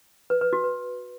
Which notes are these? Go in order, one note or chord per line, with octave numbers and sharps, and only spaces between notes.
B4
B4
F#4
B4